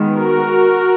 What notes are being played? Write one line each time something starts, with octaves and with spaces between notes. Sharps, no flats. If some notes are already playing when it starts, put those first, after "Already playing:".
Already playing: D#3 G#3 B3
F#4 A#4